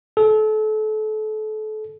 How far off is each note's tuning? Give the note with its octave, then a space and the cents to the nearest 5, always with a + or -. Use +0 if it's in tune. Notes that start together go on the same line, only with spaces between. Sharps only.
A4 -30